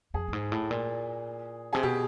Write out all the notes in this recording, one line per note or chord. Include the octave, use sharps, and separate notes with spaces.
F2 G#4
G2
G#2
A2
A#2
C3 G#4
B2 G4